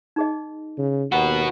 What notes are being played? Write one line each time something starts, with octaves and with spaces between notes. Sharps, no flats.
D#4 G#4 D#5
C#3
D#2 F#4 B4 F#5 G5 A#5